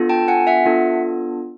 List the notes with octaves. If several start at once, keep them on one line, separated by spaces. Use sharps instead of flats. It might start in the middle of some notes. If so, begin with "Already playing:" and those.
Already playing: B3 D4 F4 A4
G5 A5
F#5 G#5
E5 F#5
B3 D4 F4 A4